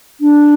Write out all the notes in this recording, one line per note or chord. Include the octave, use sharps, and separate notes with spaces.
D4